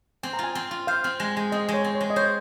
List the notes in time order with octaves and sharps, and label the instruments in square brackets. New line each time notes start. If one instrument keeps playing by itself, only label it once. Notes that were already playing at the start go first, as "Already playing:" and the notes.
[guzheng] C4 [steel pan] G#5
[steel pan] A#5
[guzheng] F4 [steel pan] G#5
[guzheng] C4
F4
[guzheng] C5 [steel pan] F5
[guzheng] C4
G#3
G#3
[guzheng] C4 [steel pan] D#5
[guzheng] G#3
[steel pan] C#5
[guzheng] C4
[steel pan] C#5
[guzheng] G#3
[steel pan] D#5
[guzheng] C5 [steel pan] C#5